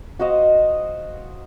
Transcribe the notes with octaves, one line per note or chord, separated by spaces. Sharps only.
F#4 C5 D#5 F5